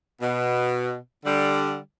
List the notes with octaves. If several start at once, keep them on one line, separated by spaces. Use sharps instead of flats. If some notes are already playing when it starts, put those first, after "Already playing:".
B2
D3 G3